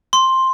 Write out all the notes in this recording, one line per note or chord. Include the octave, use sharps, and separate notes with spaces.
C6